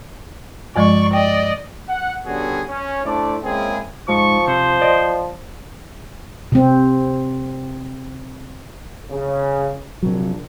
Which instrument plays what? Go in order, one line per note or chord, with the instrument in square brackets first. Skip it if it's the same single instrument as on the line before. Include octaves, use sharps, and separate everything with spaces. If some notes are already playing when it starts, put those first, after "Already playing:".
[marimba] G2 F3 G#3 [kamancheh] D5 C#6
[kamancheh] D5 D#5 [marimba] G5
[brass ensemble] F#5
D3 G3 B3 C#4 F#4 G#4
C#4
A3 D4 E4 C5 D5
G#3 A#3 C4 C#4 E4 G#4
[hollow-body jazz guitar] G#2 [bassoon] F3 [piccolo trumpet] C#6
[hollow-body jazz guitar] C3 [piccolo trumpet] C5
[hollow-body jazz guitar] D5 D#5
[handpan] C3 C4
[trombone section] C#3
[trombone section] A#1 [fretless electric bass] C3 F#3